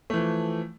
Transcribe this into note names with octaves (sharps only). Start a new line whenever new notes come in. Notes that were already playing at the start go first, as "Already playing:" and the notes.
E3 F3 A3